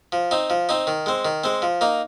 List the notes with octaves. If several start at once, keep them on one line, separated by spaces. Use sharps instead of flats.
F3
C4 D#4
F3
C4 D#4
D#3
G#3 C4
D#3
G#3 C4
F3
A#3 D#4